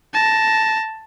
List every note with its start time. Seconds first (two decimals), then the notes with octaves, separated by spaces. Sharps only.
0.14 A5 A#6